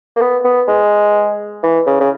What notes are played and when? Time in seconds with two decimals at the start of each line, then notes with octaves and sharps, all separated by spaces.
0.16 A#3
0.21 B3
0.45 B3
0.68 G#3
1.63 E3
1.86 C#3
2.00 C#3